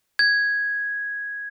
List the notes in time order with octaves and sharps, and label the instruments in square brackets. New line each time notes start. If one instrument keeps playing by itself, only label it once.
[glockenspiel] G#6